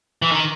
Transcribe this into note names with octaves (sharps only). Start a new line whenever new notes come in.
E3
D#3